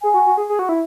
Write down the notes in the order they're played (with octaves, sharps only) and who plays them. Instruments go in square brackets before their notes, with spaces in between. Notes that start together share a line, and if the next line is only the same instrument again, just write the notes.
[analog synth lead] G#4 [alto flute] G#5
[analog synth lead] F#4
F#4
G#4
G#4
F#4
E4